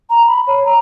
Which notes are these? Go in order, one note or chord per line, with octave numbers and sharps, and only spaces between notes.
A#5
B5
C#5
A#5